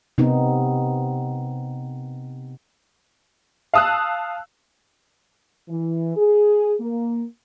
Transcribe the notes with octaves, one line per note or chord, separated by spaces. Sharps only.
C3 B3 C4 D#4
F5 A5 D#6 E6 F#6
E3
G#4
A#3